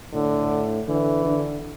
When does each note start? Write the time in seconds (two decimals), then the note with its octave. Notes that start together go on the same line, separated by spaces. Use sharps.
0.14 A2 D3
0.88 D3 E3
1.25 D3